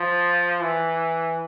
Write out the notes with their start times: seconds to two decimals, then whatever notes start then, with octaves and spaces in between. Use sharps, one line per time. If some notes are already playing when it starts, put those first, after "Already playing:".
Already playing: F3
0.62 E3